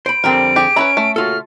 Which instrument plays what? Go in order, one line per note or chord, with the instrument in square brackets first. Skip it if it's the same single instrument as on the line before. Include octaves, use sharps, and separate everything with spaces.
[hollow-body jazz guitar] C5 B5 [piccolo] D7
[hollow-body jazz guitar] F2 D3 G5 [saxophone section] G3 C4 [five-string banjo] A#4
[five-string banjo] G4 G#4
[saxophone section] C#4 [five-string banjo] B4 C#5 E5 [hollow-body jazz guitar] A#5 B5
[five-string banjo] A3
[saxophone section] A#2 C#3 F#4 [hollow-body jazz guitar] F4 A4 [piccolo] F6